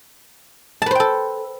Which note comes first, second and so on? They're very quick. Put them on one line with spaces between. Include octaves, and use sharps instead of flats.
A5 B4 C5 G5 A4